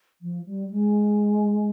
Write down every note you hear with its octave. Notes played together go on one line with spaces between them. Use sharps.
F3
G3
G#3